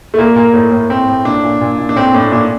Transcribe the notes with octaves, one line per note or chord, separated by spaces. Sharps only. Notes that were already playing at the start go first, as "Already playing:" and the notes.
A3
A#2 A#3
A#2 A#3
A2 A#3
A2
A2 C4
A2
A#2 D4
A#2
A#2
A#2
D4
A2 C4
A2 D4
A#2 D4